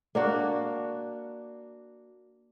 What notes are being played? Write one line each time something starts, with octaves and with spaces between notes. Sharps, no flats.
A#3 D4 F#4